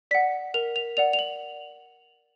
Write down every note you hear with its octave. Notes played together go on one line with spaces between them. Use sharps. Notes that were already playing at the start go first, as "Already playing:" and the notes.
D5 F#5 B6
A#4 F7
F7
D5 F#5 F7
F7
F#7